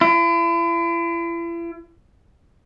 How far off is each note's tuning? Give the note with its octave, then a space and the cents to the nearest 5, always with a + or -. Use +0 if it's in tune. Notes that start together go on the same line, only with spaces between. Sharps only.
E4 +40